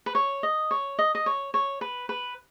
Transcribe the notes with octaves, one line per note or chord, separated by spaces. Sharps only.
B4
C#5
D#5
C#5
D#5
D#5
C#5
C#5
B4
B4